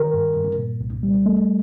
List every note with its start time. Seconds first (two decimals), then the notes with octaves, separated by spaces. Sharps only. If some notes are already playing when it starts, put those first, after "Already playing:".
Already playing: D#3 A#4
0.14 G2
0.36 G2
0.58 A#2
0.81 C2
1.03 G3
1.26 A3